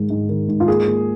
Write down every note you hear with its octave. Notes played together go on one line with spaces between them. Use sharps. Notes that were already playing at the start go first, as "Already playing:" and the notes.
Already playing: G#2 D#3 G#3
G#2
D#3
G#2
F4
A#3 G#4
A#3